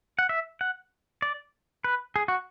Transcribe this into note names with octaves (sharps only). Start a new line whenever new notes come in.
F#5
E5
F#5
D5
B4
G#4
F#4